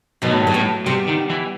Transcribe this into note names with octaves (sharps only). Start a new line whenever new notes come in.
B2 D#3 F#3
A2
G2
B3
A2 F#3 A3
C3 G3 B3
D#3
E3